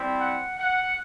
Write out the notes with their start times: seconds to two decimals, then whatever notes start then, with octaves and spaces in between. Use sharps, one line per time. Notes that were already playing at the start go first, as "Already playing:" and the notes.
Already playing: G3 C4 E4
0.19 F#5
0.59 F#5